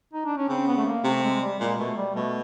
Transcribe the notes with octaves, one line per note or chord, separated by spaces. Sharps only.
D#4
D4
C#4
C#3 C4
B3
A3
A#3
C3 A3
G#3
G#3
G3
A#2 G#3
B2 A3
G3
B2 A3